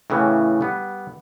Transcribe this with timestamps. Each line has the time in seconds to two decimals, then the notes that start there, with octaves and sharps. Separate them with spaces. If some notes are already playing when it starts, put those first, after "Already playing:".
0.10 A2 C#3 E3
0.61 G3 B3